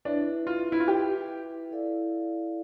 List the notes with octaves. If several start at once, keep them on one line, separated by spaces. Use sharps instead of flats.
D4 E4 B4 E5
F4
E4
F4
G4
E4 A4 D5 F5